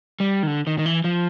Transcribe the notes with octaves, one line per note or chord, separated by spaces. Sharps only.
G3
D#3
D3
D#3
D#3
E3
F3